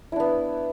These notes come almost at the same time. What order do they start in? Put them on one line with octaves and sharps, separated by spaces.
E4 D4 B3